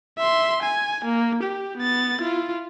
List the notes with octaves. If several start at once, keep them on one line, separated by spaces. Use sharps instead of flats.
E5 C6
G#5
A#3
G4
B3 A6
E4 F4